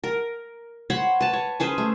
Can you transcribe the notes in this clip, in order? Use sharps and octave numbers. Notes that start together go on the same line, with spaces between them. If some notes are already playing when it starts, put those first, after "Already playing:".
A#4
C5 C#5 F#5 B5
B4 A5
C#5
C#4 G#4 B4 C5
A3